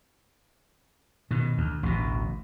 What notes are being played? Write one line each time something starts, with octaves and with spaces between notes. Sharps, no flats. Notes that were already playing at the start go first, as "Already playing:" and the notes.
B2 D#3
D2
A1 D2 B2